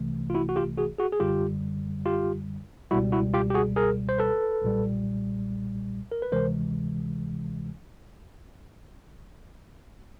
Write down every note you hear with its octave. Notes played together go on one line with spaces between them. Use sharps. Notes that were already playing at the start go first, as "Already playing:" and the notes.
Already playing: C2 C3 E3 A3
F4
E4 F#4
F#4
F4 G4
F#4 G#4
F#4 G#4
G#4
F#2 D3 G3 F4 G4
F4 G4
C#2 B2 G3 E4 F#4
E4 F#4
F4 G4
G4
F#4 G#4
G#4 A#4
C5
A4 B4
B1 A#2 G3
A#4
B4
D2 C3 E3 G#3 A#4 C5